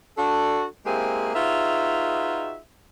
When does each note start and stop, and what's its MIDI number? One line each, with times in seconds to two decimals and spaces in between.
0.17 0.64 62
0.17 0.64 66
0.17 0.64 69
0.86 1.31 56
0.86 1.31 58
0.86 1.31 60
0.86 1.31 64
0.86 1.31 67
0.86 1.31 68
1.34 2.57 63
1.34 2.57 65
1.34 2.57 66
1.34 2.57 68
1.34 2.57 71
1.34 2.57 76